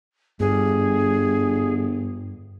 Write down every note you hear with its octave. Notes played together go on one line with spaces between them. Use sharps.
G1 G2 G#4